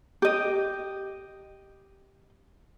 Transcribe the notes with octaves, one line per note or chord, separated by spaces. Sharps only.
G4 D#5